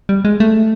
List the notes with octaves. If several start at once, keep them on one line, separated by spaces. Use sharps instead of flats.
G3
G#3
A3